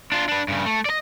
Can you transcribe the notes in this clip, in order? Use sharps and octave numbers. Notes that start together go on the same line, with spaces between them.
D4 F4
D4 B4
G2 C#3
A3
D5 D#5